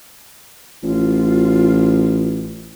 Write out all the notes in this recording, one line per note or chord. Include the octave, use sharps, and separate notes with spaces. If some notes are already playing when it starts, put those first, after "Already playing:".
A1 F4